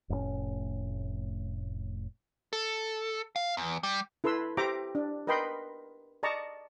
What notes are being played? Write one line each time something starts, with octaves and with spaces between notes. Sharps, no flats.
F1 A2 C4 C#4
A4
F5
E2
G3
E4 A4 B4 C6 E6
G4 C5 E5 G5 A#5 D6
D4
A#4 B4 D#5 G5 B5 C6
D5 D#5 A5 A#5 C#6